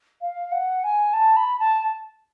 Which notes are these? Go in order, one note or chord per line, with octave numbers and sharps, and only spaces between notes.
F5
F#5
G#5
A5
B5
A5